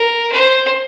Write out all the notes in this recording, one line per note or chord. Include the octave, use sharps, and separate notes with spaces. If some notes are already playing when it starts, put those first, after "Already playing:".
Already playing: A#4
C5